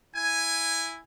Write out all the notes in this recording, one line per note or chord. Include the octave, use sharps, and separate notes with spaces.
E4 G#5